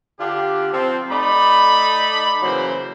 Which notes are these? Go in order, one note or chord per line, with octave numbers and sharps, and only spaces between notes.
D3 D4 F4 G4
F3 C4
A3 D#4 D5 B5
C#3 E3 F#3 A#3 C5